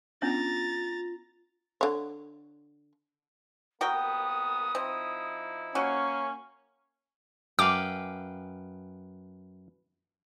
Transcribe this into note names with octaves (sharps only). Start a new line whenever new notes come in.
B3 C#4 D4 F4 A#5 A6
D3 C#5
C2 A#3 B3 F#4 A#4 G5 D#6
F3 C4 D#4 E4
A#3 C#4 F#4 C#6
F#2 B4 F5 G5 D6